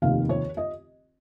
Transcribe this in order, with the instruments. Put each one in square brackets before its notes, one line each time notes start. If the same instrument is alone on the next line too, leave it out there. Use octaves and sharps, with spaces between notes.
[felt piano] F1 D#2 D#3 F5
C#5
D#5